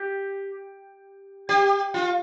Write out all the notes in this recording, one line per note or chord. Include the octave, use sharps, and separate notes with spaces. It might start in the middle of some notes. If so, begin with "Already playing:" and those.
Already playing: G4
G4
F4